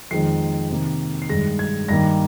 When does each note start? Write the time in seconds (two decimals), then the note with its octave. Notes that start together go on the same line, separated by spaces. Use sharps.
0.11 F2 D#3 G#3 C7
0.70 C3 D#3 A#3
1.22 C7
1.29 G2 D#3 G#3 A#6
1.59 G#6
1.88 G2 D#3 A#3 A#6